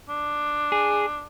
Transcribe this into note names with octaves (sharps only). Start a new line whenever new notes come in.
D4
G#4